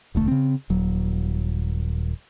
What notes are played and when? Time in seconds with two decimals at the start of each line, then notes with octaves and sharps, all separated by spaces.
0.15 E1 D2 A3
0.28 C#3 C4
0.70 D#1 F#3